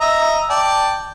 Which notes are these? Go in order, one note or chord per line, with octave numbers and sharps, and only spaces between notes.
D#5 E5 A#5
D5 G5 A5